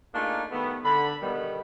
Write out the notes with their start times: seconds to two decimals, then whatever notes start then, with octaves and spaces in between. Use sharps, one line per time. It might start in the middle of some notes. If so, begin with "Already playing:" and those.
0.14 A3 A#3 D4 D#4 F4 G#4
0.51 D#3 G3 A3 B3
0.84 D3 B5
1.22 B2 D3 D#3 G3 B3